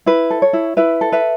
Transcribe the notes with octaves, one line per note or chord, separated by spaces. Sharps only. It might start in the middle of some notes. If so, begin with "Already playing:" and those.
E4 B4
A4
C#5
E4
E4 B4 E5
A4
B4 E5